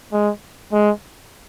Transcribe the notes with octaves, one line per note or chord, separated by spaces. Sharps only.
G#3
G#3